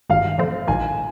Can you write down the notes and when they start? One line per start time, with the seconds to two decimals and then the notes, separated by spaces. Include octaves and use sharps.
0.09 G#1 G2 D#3 G#3 F5
0.38 A#2 F3 A3 C4
0.68 A#1 G#2 D#3 G#5